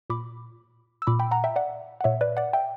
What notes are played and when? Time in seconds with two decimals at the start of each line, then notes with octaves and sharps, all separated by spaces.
0.10 A#2 B5 D6
1.02 E6
1.07 A#2 B5 D6
1.20 G5 B5
1.31 F#5 A#5
1.44 E5 G5
1.56 D5 F#5
2.01 F#5
2.04 A#2 C#5 E5
2.21 B4 D5
2.37 D5 F#5
2.53 E5 G5